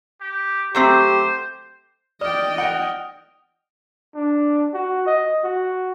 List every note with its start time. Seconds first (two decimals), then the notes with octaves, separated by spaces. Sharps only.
0.21 G4
0.75 F#3 A3 C4 G4 C5
2.21 D5 D#5 G5 D#6 F6
2.58 F#5 F#6 F7
4.15 D4
4.74 F#4
5.07 D#5
5.44 F#4